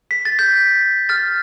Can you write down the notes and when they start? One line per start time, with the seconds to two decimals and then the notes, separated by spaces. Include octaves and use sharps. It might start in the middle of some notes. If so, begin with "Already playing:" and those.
0.11 B6
0.25 A6
0.39 G6 B6
1.09 F6 A6